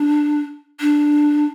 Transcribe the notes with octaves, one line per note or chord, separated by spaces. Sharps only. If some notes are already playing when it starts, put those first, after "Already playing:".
Already playing: D4
D4